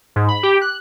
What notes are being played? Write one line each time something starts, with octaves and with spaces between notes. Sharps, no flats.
G#2
B5
G4
F#6